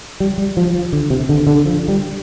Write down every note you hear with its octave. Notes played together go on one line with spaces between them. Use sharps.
G3
G3
F3
F3
D3
C3
D3
D3
F3
G3